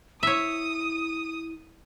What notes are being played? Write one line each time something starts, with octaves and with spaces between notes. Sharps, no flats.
E4 C#5 E5 D#6